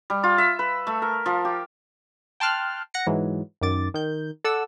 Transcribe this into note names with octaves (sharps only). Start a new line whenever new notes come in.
G3
F4
E5
B4
A3
A#4
F3
G4
G5 A5 C6 F6 F#6
F#5 A#6 C#7
G#2 E3 F#3 G#3
F#2 D#3 D6 A6
D#3 G6
A4 D5 F#5 E6